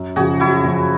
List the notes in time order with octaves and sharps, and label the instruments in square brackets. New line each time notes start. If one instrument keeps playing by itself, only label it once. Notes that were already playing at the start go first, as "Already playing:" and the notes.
Already playing: [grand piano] F#2
[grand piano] C#3 F3 [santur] F#4 G#4
[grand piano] F#2 [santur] E4 F#4
[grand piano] C#3 F3